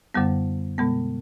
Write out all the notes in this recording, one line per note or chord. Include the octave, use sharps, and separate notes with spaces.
F#2 D3 G3 B3
B2 G#3 B3